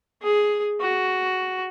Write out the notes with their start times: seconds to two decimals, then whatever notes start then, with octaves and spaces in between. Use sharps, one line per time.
0.22 G#4
0.80 F#4